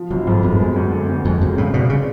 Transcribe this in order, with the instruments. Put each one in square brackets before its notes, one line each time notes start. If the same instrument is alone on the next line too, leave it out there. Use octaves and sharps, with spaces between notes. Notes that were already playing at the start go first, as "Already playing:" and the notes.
Already playing: [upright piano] F3
[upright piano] F1 [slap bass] F#3
[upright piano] F2 [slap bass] G#2
[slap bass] F#2 [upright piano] B3
[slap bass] G#2
[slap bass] F#2 [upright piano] G#3
[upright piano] D2
D3
D2
[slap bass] F2 [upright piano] G#3
[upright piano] C#2 [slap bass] F#2
[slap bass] A2 [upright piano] C#3
[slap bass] B2 [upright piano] D4
[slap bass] C#3 [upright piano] G#3